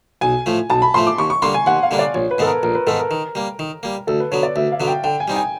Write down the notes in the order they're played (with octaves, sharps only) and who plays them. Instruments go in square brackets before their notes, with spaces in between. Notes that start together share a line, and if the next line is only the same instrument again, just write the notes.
[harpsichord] B1 [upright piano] G#5
[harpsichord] A2 F3 A3
[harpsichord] B1 [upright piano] A5
[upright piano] B5
[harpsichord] A2 F3 A3 [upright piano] C6
[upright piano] D6
[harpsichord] D#2 [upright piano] C#6
[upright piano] C#6
[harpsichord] D3 G3 A#3 D4 [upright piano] C6
[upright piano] G#5
[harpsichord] D#2 [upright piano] F#5
[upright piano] F5
[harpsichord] D3 G3 A#3 D4
[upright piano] D5
[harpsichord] A#1 [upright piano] C#5
[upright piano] B4
[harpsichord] G#2 D#3 G#3 B3 [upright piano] A4
[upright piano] A#4
[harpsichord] A#1 [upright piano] A#4
[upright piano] B4
[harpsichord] G#2 D#3 G#3 B3 [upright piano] A4
[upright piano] A#4
[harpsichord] D#3
G3 A#3
D#3
G3 A#3
[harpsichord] D2 [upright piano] A4
[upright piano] B4
[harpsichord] D3 F#3 B3 [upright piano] C#5
[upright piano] D5
[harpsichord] D2 [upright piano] E5
[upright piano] F5
[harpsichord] D3 F#3 B3
[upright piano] G5
[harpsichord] D3 [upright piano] G5
[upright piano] G#5
[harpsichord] G3 C4 D#4
[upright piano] G#5